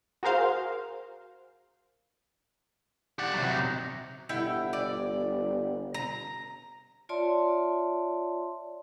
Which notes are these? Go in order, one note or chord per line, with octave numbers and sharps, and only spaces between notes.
F#4 G#4 A#4 C5 F5
G4 D5 F#5
C3 F#3
D#4
G1 E4 F#5 G5
D5
A#5
F4 C#5 D5 E5 A5 C6